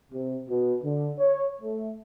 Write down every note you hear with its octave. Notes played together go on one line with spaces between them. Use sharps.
C3
B2
D3
C#5
A3